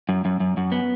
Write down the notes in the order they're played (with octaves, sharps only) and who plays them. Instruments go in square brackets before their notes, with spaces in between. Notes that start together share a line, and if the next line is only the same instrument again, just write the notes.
[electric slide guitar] F#2
F#2
F#2
F#2
B3